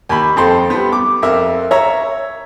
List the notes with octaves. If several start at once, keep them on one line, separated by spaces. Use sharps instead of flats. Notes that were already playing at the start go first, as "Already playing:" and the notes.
D#2 B5
F2 C4 A4 G5 C6
G3 B3
D6
F2 A#4 E5
C#5 E5 A#5